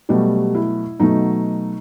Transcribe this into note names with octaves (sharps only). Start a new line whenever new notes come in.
B2 F#3 G3 A3 G4
E4
B2 F#3 A3 D#4